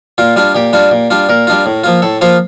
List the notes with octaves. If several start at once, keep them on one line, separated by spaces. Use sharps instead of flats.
A#2 F4
G3 D4 F4
A#2 G4
G3 D4 F4
A#2
G3 D4 F4
A#2 A#4
G3 D4 F4
A2
F3 A#3 F4
A2 A4
F3 A#3 F4 C5